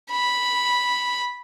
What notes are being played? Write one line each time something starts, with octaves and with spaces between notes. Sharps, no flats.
B5